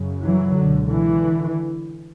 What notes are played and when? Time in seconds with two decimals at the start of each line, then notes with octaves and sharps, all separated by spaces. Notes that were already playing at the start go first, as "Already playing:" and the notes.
Already playing: F#2 C#3
0.23 E3 F#3
0.56 C#2 B2 D3
0.89 D3 E3